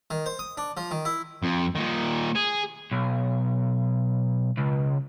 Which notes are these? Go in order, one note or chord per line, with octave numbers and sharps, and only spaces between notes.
D#3
C5
D#6
D4
F3
D#3
E4
F2
A#2 D#3
G#4
B1
C#2